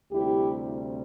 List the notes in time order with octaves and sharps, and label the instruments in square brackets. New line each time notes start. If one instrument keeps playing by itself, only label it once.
[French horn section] D2 C3 G3 E4 G4